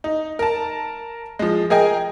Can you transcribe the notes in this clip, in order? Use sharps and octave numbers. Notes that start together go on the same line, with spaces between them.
D#4
A#4 A5
F3 G#3
G#4 A#4 D#5 G5 G#5